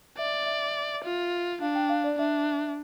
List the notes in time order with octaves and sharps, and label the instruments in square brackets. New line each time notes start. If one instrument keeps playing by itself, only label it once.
[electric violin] D5 [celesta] E5
[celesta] E5
[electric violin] F4
[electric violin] D4 [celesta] F5
[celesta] G5
F5
D5
[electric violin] D4 [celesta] E5